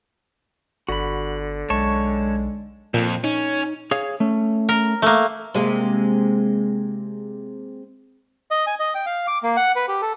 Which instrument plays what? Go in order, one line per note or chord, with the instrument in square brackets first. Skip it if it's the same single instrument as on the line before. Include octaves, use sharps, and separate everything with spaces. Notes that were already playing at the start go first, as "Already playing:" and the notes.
[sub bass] G1 [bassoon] D3 [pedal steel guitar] F#4 B5
[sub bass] B1 [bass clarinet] G#3 [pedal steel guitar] C#5 A5 C#6
[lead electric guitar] F2 [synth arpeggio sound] A#2
[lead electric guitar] C#4 [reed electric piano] D#4
[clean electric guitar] G#4 C#5 F5
A3 C#4
[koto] A#4
A3 A#3
[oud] C3 G#3 A#3
[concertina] D#5
G#5
D#5
G5
F5
D6
A#3
F#5
B4
G4
A4